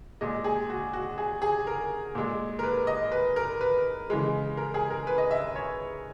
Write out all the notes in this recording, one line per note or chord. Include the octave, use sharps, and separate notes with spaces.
A#2 G#3 D#5
G#4
F#4
F#4
G#4
G#4
A#4
A#2 G#3
A#4
B4
D#5
B4
A#4
B4
C#3 E3 G#3
A#4
G#4
A#4
B4
D#5
E5
C#5